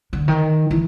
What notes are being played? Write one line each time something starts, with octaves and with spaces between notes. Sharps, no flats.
D3
D#3
E3